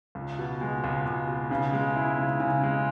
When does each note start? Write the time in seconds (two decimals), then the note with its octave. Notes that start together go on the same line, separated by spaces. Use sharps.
0.15 C#2
0.39 B2
0.61 G#3
0.84 C#2
1.06 C#2
1.28 B2
1.51 C#3
1.73 G#3
1.96 E4
2.18 C#3
2.40 C#3
2.63 G#3